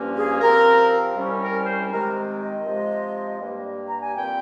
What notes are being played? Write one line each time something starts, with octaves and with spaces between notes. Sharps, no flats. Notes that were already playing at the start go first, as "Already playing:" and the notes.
Already playing: G2 F3 A#3 C#4
G#4
C3 F3 C4 A#4
C2 C3 G3 C#4
A#4
C5
C3 D#3 G#3 C4 A#4
D#5
C3 F3 G#3
G2 G3 A#3
A#5
G#5
A#2 G3 C4 G5